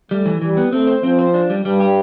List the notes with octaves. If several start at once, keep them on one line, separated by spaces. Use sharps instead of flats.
G3 A3
E3
E3 G3
B3
A3 C4
C5
F3 C4
C5
D4
G3
G2 G3
G4